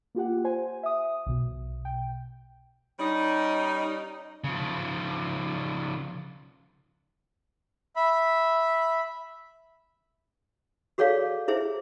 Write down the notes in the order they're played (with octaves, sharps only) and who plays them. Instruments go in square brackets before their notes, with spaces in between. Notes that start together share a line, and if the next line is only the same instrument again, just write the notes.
[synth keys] A#3 F4 G4 F#5
C5 G#5
E5 D#6
B1 B2
G5
[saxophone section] G3 C#4 D#4
[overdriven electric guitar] C#3 F3
[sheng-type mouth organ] E5 B5
[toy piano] F#4 G#4 A4 C#5 D5 F5
E4 G#4 C5 E5